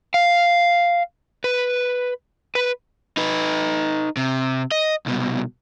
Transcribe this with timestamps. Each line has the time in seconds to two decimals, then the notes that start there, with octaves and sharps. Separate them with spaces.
0.14 F5
1.44 B4
2.55 B4
3.17 D#4 B4
4.17 C3
4.71 D#5
5.06 C2 B2